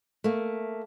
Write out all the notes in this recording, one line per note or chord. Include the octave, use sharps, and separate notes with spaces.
A3 A#3